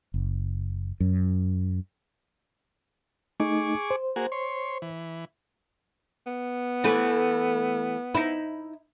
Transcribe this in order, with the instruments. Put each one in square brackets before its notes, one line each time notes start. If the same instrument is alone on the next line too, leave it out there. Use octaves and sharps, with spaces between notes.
[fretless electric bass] F#1
F#2
[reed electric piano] A3 D#4 [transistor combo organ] G#4 C#6 D6
[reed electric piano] C5
[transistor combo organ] A#3 F#4 G#4
C#5 C6
E3
[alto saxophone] B3
[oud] E3 A3 B4
D#4 E4